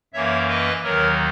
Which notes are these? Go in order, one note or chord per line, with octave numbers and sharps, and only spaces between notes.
F#2 E3 A#3 C#5 E5
B4 D#5
D#2 D#3 F#3 A#4 C#5